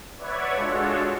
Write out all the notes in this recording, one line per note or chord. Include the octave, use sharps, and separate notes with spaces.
B4 C#5 D5 E5 F#5 G#6
G#3 D4 F4 F#4 A4 C#5